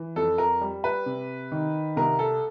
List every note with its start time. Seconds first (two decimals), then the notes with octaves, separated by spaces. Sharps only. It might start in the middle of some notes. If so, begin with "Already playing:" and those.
Already playing: E3
0.16 F2 A4
0.38 A#4
0.61 G3
0.84 B4
1.06 C3
1.52 D#3
1.96 C2 A#4
2.19 A4